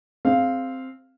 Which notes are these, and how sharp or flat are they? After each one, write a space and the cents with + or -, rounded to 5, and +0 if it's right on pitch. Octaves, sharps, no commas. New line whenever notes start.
C4 +0 G#4 +0 F5 -5